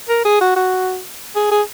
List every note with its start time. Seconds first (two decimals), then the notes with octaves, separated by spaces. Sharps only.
0.09 A#4
0.25 G#4
0.41 F#4
0.56 F#4
1.36 G#4
1.51 G#4